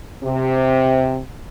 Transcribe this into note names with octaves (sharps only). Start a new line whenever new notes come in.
C3